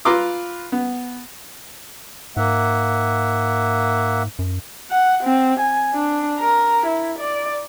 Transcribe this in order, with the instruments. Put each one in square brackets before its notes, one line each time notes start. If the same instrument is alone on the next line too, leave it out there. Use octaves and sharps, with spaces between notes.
[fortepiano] F4 B4 A#5 C6 D6 E6
B3
[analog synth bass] G#2 [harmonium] A#3 E5 F#5
[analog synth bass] F#2
[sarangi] F#5
C4
G#5
D4
A#4
E4
D5